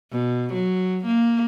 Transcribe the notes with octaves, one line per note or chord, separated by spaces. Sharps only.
B2
F#3
A#3